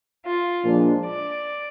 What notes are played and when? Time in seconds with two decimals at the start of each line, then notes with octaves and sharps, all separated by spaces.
0.25 F4
0.65 A#2 F3 G#3 D4
1.05 D5